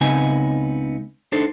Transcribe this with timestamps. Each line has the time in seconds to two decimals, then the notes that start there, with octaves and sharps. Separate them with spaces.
0.01 C#2 C#3 B3 C4 D#4 G#5
1.32 D4 D#4 A4 C5